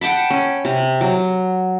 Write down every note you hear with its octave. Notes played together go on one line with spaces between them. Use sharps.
F#5 G5 A5 B5
C#4
C3
F#3